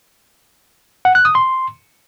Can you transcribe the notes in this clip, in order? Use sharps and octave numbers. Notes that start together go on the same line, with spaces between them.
F#5
F#6
D#6
C6